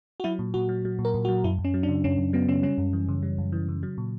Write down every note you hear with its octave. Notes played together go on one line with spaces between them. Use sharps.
F#4
F#3 E4
A#2
A#2 F#4
F#3
F#3
A#2
A#4
A#2
F#4
F#3
F#2 E4
F#2
C#4
F#3
D4
C#3
F#2 C#4
F#2
F#3 B3
C#3 C#4
G3 C#4
F#2
E3
C#3
G3
F#2
E3
C#3
F#3
A#2